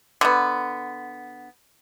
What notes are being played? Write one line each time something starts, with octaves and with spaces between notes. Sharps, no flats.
D3 B3